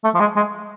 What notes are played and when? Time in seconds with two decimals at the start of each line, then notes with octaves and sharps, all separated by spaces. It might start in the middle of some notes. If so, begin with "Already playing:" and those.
0.04 A3
0.14 F3
0.20 G#3
0.36 G#3